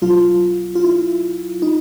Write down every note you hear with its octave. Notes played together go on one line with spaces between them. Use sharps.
B1 B2 F#3 F4
F4
E4
D#4